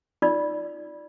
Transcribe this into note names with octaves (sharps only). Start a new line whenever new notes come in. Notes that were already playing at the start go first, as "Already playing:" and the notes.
D#4 F4 D5